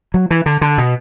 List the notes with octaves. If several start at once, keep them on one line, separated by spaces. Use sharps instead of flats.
F#3
E3
D3
D3
B2